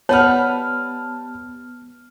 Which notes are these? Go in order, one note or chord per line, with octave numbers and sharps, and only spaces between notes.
G3 B3 B4 C#5 F#5 A5 F6